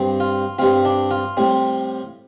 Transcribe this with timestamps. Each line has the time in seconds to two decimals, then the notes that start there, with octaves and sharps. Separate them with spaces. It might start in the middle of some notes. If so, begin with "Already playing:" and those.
Already playing: G2 G3 C4
0.20 F4
0.59 G2 G3 C4 F4
0.85 D4
1.11 F4
1.37 A2 G3 C4